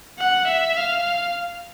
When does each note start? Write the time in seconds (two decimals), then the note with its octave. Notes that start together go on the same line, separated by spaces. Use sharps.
0.18 F#5
0.47 E5
0.77 F5